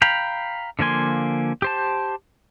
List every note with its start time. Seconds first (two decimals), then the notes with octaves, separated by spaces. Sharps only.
0.02 F5 G5 A#5 B5
0.79 D3 F3 A#3 G#5 C6
1.62 G4 C5 A5